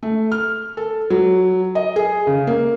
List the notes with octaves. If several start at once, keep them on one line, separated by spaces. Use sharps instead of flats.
A3
F6
A4
F#3
D#5
G#4
C#3
A#3